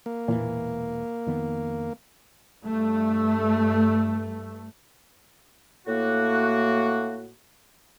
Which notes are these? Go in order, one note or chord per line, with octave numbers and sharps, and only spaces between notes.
A#3
E1 B1 A#2 E3
F2 D#3 B3
G2 A3
A2 A#3 F#4